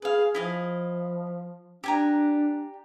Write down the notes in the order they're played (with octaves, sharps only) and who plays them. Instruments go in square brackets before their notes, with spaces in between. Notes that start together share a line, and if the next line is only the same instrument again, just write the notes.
[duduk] G#4 [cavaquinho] B4 F5
[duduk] F3 [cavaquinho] E4 D#5 F5
[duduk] D4 [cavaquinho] G4 G#5 A#5